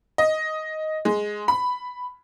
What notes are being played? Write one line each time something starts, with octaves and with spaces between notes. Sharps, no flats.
D#5
G#3
B5